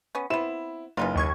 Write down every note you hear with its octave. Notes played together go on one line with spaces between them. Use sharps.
B3 C#4
B3 C4 E4 E7
F#1 E3 D#4 F4
D#2 C#6 G#6